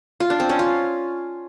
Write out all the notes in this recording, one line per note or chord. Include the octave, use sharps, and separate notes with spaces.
F4
D4
C4
C#4
F4